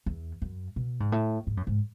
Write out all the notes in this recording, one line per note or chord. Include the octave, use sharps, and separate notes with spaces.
E2
F#2
B2
G#2
A2
G#2
F#2
G#2